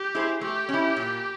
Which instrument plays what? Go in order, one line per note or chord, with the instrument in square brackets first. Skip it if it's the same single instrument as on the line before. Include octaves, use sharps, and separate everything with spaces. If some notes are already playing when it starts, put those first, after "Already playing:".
Already playing: [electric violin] G4
[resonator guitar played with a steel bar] E4 G#4 C5
[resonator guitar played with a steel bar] A3 [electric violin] G4
[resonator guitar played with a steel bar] C#4
E4
A#2